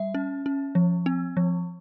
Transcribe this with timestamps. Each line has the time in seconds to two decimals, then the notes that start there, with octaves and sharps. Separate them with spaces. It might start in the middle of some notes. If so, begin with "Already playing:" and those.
Already playing: G3 E5
0.14 C#4
0.46 C#4
0.75 F3
1.06 C4
1.37 F3